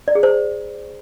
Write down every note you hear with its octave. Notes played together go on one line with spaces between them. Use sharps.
D5
G#4
C5